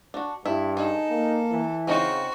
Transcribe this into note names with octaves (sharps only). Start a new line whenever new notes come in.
D4 F#4
G2 E4
D#4 G#4 A4
A#3
E3
C#3 C4 D#4 F4 F#4